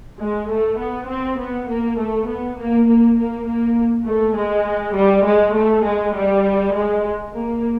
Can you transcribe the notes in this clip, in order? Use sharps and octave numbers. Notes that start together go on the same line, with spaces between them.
G#3
A3
B3
C4
B3
A#3
A3
B3
A#3
A#3
A#3
A#3
A3
G#3
G3
G#3
A3
G#3
G3
G#3
A#3